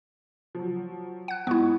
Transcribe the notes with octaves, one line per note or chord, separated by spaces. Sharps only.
F3 F#3
F#5 F#6
G#2 B3 E4 C#6